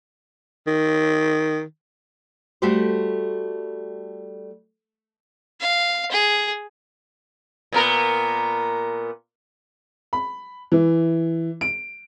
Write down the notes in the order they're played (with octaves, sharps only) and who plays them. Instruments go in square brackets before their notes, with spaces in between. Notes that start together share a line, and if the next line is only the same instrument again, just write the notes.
[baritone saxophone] D#3
[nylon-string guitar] G3 A3 F#4 G4 A4 C5
[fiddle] F5
G#4
[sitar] A#2 B3 A#4
[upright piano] B5
E3
D7